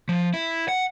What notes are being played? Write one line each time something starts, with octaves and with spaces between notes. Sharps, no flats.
F3
E4
F#5